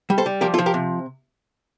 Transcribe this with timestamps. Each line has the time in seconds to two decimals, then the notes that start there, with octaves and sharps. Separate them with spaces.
0.10 G3
0.18 A4 C5
0.26 G3
0.41 F3 G4 A#4
0.54 F4 A4
0.58 F3
0.66 G4 A#4
0.74 C3